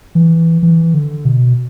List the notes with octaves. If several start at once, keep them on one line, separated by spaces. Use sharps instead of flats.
E3
E3
D3
B2